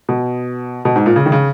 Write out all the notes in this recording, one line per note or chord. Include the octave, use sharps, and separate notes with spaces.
B2
B2
G#2
A#2
C#3
D#3
C#3